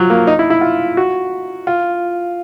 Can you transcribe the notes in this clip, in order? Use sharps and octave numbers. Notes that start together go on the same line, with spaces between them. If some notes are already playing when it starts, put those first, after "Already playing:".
Already playing: F3 F#3
A#3
D#4
E4
E4
F4
F#4
F4